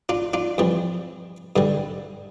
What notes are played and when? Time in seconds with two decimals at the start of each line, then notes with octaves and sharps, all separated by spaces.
0.09 D4 F4
0.34 D4 F4
0.58 F2 E3 G3
1.56 G2 D3 G3